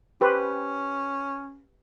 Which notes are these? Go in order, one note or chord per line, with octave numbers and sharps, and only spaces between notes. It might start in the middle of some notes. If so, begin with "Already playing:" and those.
C#4 G4 B4 C5